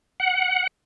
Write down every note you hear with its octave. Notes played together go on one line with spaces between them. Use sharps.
F#5